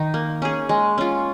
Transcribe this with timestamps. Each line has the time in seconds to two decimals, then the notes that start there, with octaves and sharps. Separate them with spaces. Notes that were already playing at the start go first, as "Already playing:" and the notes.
Already playing: D#3 D#4
0.14 A#3
0.42 C#4 G#4
0.69 G#3
0.98 C#4 F4